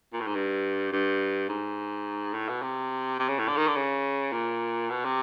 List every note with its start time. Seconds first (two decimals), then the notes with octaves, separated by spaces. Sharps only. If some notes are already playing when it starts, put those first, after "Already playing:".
0.13 A#2
0.21 A2
0.27 G#2
0.35 G2
0.92 G2
1.49 G#2
2.34 A2
2.49 B2
2.62 C3
3.19 C3
3.29 C#3
3.39 A2
3.48 D3
3.57 D#3
3.67 D3
3.76 C#3
4.32 A#2
4.90 B2
5.05 C3